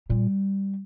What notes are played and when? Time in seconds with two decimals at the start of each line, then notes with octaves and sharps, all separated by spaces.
0.10 A#2 G3